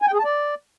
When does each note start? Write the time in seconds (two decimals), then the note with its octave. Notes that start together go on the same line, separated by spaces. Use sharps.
0.02 G#5
0.08 G5
0.13 G#4
0.19 A5
0.25 D5